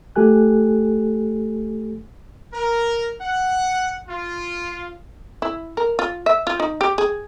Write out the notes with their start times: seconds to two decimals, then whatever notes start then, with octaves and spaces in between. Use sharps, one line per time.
0.16 A3 G4 A4 G#5 F#6
2.53 A#4
3.21 F#5
4.09 F4
5.42 E4
5.77 A#4
5.99 F4
6.26 E5
6.47 F4
6.60 D#4
6.81 G4
6.98 G#4